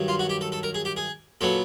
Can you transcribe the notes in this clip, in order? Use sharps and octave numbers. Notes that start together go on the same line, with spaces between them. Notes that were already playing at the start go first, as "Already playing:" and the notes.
Already playing: G2 D#3 F#3
F4
F#4
G4
A4
A4
A#4
G#4
G4
G#4
A#2 F#3 B3 A4